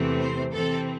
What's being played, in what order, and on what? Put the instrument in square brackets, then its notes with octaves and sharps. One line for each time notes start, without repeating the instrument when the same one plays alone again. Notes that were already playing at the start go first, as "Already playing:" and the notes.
Already playing: [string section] E2 C3 E3 A3 C4
C5
C3 E3 C4 A4